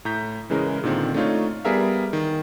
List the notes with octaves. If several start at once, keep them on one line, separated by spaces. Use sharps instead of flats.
A2 A#5 G6 B6
C#3 E3 G#3 C#4 A#4
A#2 D3 D#3 C4
A3 D4 D#4 F4 C#5
G3 B3 G#4 A#4 E5 F5
D#3